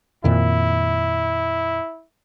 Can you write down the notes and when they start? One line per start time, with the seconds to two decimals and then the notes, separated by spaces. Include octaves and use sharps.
0.24 F2 A#2 D#3 E4